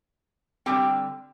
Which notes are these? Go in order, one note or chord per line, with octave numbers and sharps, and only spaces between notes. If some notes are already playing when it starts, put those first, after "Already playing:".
D3 G3 C4 G4 G5